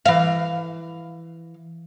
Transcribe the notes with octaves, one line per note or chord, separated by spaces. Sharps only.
E3 F5